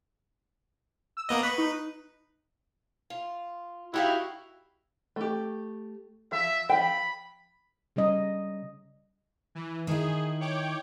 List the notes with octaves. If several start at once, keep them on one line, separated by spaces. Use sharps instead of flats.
E6
A#3 B3 D#5
B4 B5 C#6
D#4
F4
D#4 E4 F#4 G4 F5
A3 G4
F3 E5
F3 G5 B5
C#3 G3 C#4 D#5
E3
D#3 E4 G#4
C#5 G5 D6